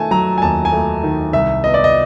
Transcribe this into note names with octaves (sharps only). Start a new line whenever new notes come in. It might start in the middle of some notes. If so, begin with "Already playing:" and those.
Already playing: D#3 A3 G#5 A5
F#3 A#5
G#5
D#2 A5
G#5
A3
D#3
C2 E5
B3 D#5
D5
D#5